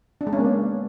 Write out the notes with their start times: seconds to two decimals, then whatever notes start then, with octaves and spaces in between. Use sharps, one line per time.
0.21 D4
0.27 G#3
0.33 C#4
0.39 A#3
0.45 B3